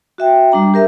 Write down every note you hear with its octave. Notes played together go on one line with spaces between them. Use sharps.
F#4 E5 G5
G3 D4 A#5
G4 A#4 E5